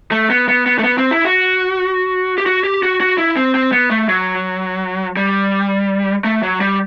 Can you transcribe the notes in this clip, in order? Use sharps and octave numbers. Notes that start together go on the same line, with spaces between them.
A3
B3
B3
B3
A3
B3
C4
E4
F#4
G4
F#4
G4
F#4
F#4
E4
C4
C4
B3
A3
F#3
G3
A3
F#3
G3